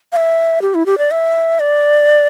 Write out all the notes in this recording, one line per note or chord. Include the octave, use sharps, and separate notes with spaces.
F5
E5
G4
E4
G4
D5
E5
D5